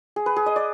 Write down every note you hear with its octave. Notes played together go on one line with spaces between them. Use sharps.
G#4
B4
G#4
D#5
D5